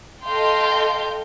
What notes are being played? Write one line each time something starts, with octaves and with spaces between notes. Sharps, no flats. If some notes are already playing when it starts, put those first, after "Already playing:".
A4 D#5 F5 G5 C6 G6